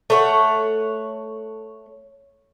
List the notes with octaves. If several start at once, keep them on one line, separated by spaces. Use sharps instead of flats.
A3 C#5 F#5